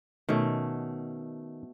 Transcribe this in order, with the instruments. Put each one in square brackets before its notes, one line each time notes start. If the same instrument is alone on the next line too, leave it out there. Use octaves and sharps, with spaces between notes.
[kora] B2 A3 [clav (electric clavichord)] D#3 C#4